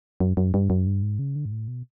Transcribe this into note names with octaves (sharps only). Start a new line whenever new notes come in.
F#2
F#2
G2
F#2
G2
G#2
C#3
D3
G#2
A2
B2